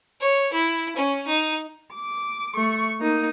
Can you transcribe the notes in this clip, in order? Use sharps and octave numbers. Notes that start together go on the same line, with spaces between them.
C#5
E4
C#4
D#4
D6
A3 C#6
A#3 D#4